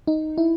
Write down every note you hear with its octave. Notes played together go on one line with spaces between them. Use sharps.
D#4
E4